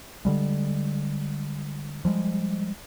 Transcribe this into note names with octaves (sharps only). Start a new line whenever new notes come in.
D3 G3 G#3
F3 G3 G#3